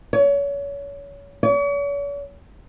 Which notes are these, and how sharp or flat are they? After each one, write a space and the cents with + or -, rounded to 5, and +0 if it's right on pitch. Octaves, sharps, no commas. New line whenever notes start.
C#5 +30
C#5 +45